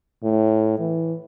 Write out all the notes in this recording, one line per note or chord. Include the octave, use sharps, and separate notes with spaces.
A2
E3